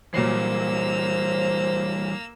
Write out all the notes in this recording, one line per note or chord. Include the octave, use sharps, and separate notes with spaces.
A#2 E3 F#3 G3 A#3 C5 E6 C7